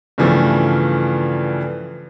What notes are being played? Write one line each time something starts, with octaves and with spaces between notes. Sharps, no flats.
G2 C#3 E3 F3 A3